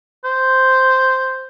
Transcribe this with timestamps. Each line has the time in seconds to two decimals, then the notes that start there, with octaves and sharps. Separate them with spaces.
0.24 C5